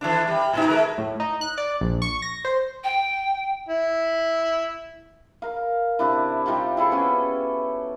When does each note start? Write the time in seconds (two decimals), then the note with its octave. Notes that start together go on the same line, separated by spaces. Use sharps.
0.01 E3 A3 D4
0.27 G3
0.53 G#2 B2 D#4
0.67 G#3 A#4 B4
0.98 A2
1.20 D#4
1.41 F#6
1.58 D5
1.81 A#1
2.02 C#6
2.22 A#6
2.45 C5
2.84 G5
3.69 E4
5.42 A#4 F5
5.99 C3 D4 E4
6.46 G3 D#4 F4 G4
6.77 E4 G#4 A4
6.91 B3 C#4 G4